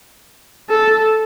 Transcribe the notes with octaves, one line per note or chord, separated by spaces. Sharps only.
A4